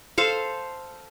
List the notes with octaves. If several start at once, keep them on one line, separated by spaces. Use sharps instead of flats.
A4 C5 F5